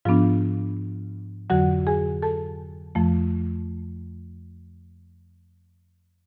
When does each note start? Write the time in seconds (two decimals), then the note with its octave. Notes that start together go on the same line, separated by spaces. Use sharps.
0.05 G#2 F3 B3 D4 F4 F5
1.50 F2 D3 F#3 F#4 F#5
1.87 G#4 G#5
2.22 A4 A5
2.95 F2 F3 A3